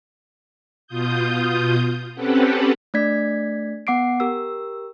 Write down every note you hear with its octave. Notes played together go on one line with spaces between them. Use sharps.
B2 F4 D#6 G6
C4 C#4 G4 A4 B4 F#5
A3 D4 D5 G#6 B6
B3 F#5 D6 C7 D7
G4 A#4 E6